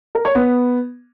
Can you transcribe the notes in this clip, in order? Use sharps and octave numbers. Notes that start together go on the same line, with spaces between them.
A#4
C#5
B3